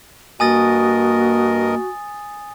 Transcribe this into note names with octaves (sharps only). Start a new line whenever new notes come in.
G2 A#3 F#4 A#4 D#5 G#5 D#6 A6